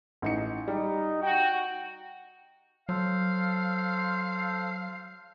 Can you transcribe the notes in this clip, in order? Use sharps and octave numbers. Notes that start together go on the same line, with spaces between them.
A1 D#4 C#7
G3 D#4
F#4 G5
F#3 A4 C5 F5